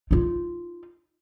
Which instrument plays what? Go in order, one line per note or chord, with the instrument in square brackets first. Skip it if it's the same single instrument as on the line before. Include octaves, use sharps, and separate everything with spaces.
[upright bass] D#4 F4